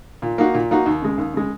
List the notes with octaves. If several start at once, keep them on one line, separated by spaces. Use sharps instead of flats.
A#2
A#3 D#4 F#4
A#2
A#3 D#4 F#4
D#2
C#3 G#3
D#2
C#3 G#3